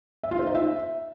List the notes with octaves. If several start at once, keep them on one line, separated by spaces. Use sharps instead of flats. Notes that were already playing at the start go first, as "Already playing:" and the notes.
E5
F4
C5
D#4
E5